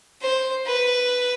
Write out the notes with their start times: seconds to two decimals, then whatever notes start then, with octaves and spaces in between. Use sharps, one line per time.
0.22 C5
0.66 B4